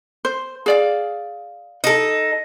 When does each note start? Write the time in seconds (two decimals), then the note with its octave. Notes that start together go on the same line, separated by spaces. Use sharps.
0.25 C5
0.66 G#4 D5 F5
1.84 D#4 A4